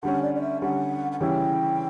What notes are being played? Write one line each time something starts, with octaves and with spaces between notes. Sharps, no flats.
D3 G3 C#4 F#5
D5
D5
E5
D3 G3 C#4 F#5
F#5
C#3 E3 G3 C#4 E4 G5